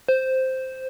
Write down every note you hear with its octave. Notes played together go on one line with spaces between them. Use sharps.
C5